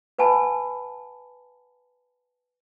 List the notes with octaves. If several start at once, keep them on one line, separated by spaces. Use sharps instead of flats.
B4 F#5 G#5 A5 B5